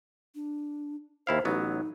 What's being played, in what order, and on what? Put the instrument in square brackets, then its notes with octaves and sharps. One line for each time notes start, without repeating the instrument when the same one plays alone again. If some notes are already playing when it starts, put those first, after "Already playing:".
[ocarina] D4
[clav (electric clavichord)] D#2 E4 F5 [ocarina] C5
[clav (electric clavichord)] A1 F#3 B3 [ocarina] D#4